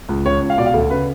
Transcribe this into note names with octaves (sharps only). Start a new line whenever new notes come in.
C#2
C#3 C#5
C#2
F5
B2 D5
F5
D2 A4
C#3 B4